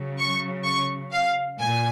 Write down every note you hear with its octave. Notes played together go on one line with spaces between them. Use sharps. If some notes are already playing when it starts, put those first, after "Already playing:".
Already playing: C#3 F#3
C#6
C#6
F5
A#2 G#5